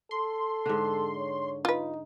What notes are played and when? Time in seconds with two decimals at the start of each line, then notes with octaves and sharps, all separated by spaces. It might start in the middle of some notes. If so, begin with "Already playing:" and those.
0.11 A4 C6
0.66 G#2 D3
1.17 C#5
1.65 D#4 F4 B4